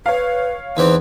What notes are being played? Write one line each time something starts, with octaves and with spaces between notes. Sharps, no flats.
B4 C#5 F5
E2 E3 C4 D#4